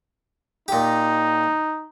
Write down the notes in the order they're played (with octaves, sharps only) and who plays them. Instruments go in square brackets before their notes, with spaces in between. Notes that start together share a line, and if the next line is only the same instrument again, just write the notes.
[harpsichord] A#2 G4 [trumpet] D#4